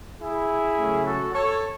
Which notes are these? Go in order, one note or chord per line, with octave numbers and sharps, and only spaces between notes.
E4 G#4
C#3 F#3 A3 C#4
F#4 A4
A4 C#5